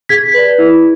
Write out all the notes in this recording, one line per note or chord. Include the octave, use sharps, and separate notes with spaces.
G#4 G#6 B6
B4 D5
E4